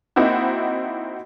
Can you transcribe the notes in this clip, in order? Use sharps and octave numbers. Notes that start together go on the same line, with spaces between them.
A#3 C4 D#4 E4 F#4